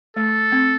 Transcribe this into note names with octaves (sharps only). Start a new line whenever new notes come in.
A3 A4
C4